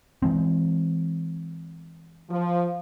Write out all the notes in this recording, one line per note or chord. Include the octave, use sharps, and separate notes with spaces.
E3 G#3 C4
F3